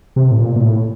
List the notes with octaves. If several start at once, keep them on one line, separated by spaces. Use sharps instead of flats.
C3
A2
A#2
A#2
A2